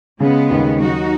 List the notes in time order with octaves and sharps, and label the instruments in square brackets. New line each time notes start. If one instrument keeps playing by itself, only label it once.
[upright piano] C#3 [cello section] G#3 B3
[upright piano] D#2
[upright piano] F#3 [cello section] D#4 F#4